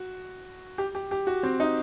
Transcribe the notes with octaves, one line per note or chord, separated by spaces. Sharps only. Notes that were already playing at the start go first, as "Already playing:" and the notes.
Already playing: F#4
G4
G4
G4
F#4
C4
D#4